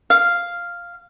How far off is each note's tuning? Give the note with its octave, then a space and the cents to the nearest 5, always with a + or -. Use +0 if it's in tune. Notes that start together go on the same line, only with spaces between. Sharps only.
F5 -5